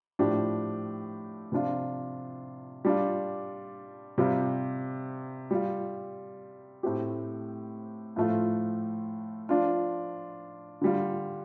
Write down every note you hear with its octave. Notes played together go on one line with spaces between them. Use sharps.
A2 F3 D4 G4
C3 F3 D4 F4
G3 D4 F4
C3 G3 F4
G3 F4
A2 A3 C4 G4
A2 F3 A3 F4
F3 D4 F4
D3 G3 F4